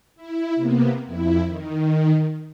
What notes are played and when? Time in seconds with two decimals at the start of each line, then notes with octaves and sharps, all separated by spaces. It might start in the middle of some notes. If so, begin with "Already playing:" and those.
0.15 E4
0.56 C3 A#3 B3
1.06 F2 E4
1.45 D#3